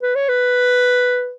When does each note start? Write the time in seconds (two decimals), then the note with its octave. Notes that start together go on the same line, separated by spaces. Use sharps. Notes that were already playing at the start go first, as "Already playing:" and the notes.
0.02 B4
0.15 C#5
0.29 B4